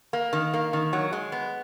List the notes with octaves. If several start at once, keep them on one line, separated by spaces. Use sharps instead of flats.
A#3
D#3
A#3
D#3
F#3
G#3
B3